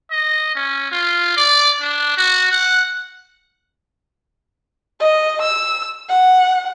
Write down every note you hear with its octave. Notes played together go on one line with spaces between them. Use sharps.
D#5
C#4
F4
D5
D4
F#4
F#5
D#5
E6
F#5